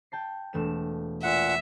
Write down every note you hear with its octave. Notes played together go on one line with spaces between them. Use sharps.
G5 A5 C7
E1 A3 E7
A#2 E5 F#5